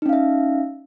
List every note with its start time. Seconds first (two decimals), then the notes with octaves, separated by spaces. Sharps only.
0.02 D#4
0.06 C#4
0.09 F5
0.13 E5